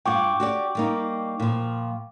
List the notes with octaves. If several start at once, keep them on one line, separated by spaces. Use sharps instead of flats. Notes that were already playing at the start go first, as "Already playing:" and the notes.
G2 F4 F#5 G5 C#6 D6
F#4 G4 D5
G3 A#3 D#4
A#2 F3